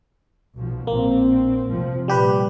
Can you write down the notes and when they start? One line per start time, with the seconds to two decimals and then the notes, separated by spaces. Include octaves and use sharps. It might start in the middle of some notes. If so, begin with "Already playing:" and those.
0.56 B1 B2 F3
0.87 A#1 A#2 A#3 C4
1.68 F1 C3 F3
2.08 A#2 G3 G4 B4